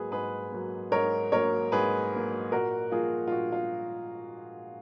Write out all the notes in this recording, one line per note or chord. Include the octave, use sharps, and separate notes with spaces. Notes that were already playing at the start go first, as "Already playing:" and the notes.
Already playing: G#2 F#3 A#3 G#4 B4
G#2 G#4 B4
F#3 A#3
G#2 A#4 C#5
F#3 A#3 A#4 C#5
G#2 G#4 B4
F#3 A#3
A#2 F#4 A#4
F3 A#3 F4 G#4
F4
A#2 F#4
F4